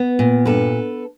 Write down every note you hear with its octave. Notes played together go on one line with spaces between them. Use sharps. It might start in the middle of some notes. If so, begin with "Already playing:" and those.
Already playing: B3
A#2
G2 A4 B4